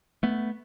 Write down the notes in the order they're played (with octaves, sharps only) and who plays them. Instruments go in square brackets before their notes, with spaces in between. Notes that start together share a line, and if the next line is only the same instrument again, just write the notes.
[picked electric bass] A3 B3